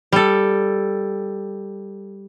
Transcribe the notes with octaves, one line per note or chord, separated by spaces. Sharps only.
G3 A4